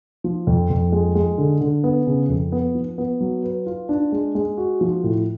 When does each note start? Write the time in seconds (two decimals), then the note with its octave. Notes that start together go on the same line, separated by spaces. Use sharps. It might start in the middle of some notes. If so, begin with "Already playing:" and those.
0.24 F3
0.47 F2
0.70 F2
0.92 G#3
1.15 G#3
1.38 D3
1.61 D3
1.84 B3
2.07 C#3
2.29 F2
2.52 B3
2.75 F3
2.98 B3
3.21 F#3
3.44 B4
3.66 F4
3.89 D4
4.12 G#3
4.35 G#3
4.58 F#4
4.81 F3
5.03 A2